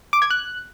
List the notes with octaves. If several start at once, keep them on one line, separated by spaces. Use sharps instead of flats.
D6
G#6
F#6